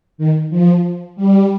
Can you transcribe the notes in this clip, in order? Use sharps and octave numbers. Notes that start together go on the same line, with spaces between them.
D#3
F3
G3